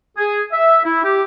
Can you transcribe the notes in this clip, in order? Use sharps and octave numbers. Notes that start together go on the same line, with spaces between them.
G#4
E5
E4
G4